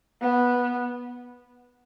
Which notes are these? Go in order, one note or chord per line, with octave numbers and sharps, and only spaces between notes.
B3